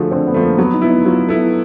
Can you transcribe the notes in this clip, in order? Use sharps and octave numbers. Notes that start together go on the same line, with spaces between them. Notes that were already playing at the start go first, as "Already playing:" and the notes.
Already playing: D3 F3 A3 F#4 G#4
D3 C4
B3
F3 A3
A#3
F#3 B3
D#4
B3 E4
D#4
F#3 F4
B3 E4 A4